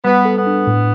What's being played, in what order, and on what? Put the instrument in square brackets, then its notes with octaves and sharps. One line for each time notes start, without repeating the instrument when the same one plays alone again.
[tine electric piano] G3 [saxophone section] B3
[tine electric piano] A4
[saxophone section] B3
[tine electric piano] D4
A2